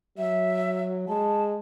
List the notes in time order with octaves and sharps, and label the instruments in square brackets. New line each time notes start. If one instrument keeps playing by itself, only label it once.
[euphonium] F#3 [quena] E5
[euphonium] G#3 [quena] A5